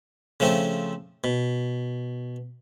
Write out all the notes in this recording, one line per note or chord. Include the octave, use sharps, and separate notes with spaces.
C#3 F3 A3 C4
B2